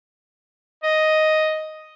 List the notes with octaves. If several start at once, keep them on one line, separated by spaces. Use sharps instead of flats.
D#5